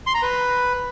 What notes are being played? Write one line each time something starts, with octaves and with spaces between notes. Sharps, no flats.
C6
A#5
B4